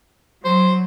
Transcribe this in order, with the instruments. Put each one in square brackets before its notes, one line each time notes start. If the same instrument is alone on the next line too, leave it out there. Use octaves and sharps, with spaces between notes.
[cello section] F#3 [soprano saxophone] C5